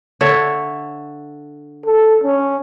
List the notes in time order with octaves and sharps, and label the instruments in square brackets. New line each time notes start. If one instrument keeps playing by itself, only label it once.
[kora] D3 C#5 E5
[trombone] A4
C#4